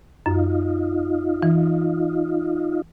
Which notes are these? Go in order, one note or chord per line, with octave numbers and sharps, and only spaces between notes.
F#2 D#4 F4
E3